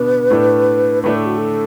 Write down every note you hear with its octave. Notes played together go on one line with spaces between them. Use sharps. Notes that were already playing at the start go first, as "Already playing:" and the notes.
Already playing: B2 B3 D4 B4
A2 A3 D4
A2 A3 D4 B4
A4
F#4
A4